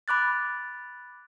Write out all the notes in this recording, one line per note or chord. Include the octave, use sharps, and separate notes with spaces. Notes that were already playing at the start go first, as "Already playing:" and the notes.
B5 D6 F#6 A6